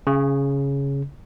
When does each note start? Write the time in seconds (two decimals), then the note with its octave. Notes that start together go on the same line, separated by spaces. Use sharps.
0.07 C#3